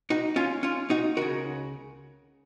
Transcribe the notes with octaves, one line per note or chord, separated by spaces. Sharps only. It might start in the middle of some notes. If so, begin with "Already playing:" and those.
D#4 F#4
C#4 F4
C#4 F4
D#4 F#4
C#2 C#3 F#4 A#4